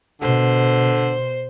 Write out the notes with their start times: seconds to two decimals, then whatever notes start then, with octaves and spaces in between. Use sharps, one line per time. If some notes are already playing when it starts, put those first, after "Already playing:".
0.22 B2 D3 C5